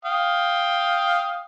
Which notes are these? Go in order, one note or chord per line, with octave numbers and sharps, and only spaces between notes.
F5 G5 D#6